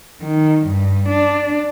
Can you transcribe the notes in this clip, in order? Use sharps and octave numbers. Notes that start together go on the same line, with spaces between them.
D#3
G2
D4